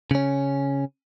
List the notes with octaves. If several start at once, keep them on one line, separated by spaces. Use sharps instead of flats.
C#3 C#4